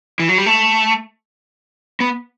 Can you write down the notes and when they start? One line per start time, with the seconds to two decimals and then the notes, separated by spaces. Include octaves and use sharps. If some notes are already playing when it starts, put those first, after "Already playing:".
0.20 E3
0.29 F#3
0.38 G3
0.46 A3
2.00 B3